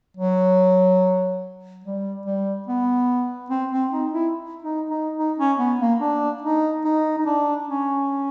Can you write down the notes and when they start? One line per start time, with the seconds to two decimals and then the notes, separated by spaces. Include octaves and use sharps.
0.17 F#3
1.84 G3
2.26 G3
2.68 B3
3.50 C4
3.72 C4
3.92 D#4
4.13 E4
4.62 D#4
4.90 D#4
5.17 D#4
5.38 C#4
5.59 B3
5.80 A#3
6.01 D4
6.42 D#4
6.84 D#4
7.18 D#4
7.25 D4
7.68 C#4